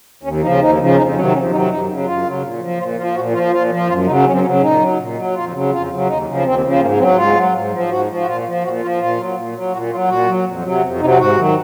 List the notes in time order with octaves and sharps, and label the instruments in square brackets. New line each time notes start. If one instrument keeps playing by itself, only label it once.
[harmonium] D#2 C#4
C#3 F3 D#4
D#2 D#4
C#3 F3
F2 D#4
C3 D#3 F#3 C#4
F2 C#4
C3 D#3 F#3 D#4
F#2 D#4
C#3 F#3
F#2 F4
C#3 F#3
A#2
F3
A#2 F4
F3 F4
A#2 F#4
F3 F4
A#2 F4
F3
F#2 F4
C#3 F#3 D#4
F#2 C#4
C4
C#4
C#3 F#3
A#2 D#4
F#3
A#2
F#3
F2 F4
C#3 F#3
F2 F4
C#3 F#3
D#2 D#4
C#3 F3
D#2 C4
C#3 F3
G#2 A#3
F#3 C4
G#2 F4
F#3
G#2
F3
G#2 F#4
F3
F#4
A#2 F4
F3
A#2 F#4
F3 F4
A#2 F4
F#3
A#2
F#3
A#2 F#4
F#3 F4
A#2 F#4
F#3
F2
C3 F#3
F2
C3 F#3 D#4
G#2 F#4
D#3 F#3